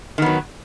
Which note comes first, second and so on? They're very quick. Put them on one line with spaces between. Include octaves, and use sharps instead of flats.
D#3 B3 F#3